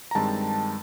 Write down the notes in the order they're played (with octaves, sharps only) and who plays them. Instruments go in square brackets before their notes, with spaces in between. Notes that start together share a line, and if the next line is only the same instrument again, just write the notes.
[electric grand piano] A#5
G2 D#3 G#3 C4 A5